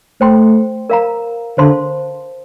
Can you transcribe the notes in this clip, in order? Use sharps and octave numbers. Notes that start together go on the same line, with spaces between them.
A3 C5 G5 C6
A#4 F5 A#5
D3 C5 F5 A5 C6